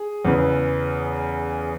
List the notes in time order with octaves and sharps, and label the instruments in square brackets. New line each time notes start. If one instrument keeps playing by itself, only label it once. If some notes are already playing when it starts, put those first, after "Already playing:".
Already playing: [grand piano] G#4
E2 C#3 E3